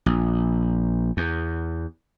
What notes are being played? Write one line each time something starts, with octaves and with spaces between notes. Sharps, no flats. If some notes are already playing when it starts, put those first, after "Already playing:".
A#1
E2